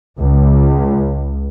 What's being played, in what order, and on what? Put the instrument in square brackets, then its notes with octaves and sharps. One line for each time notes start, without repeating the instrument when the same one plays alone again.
[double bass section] C#2